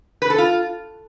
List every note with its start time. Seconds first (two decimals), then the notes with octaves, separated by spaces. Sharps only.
0.22 B4
0.30 A4
0.38 F4